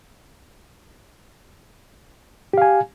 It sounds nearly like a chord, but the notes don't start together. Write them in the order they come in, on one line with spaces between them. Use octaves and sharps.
G4 F5 G#5